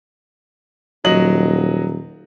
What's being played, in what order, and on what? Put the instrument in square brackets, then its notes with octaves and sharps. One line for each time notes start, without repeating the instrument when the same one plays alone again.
[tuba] D#1 [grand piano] F#3 D#5 F#7